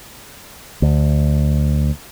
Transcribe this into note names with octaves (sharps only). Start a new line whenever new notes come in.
D2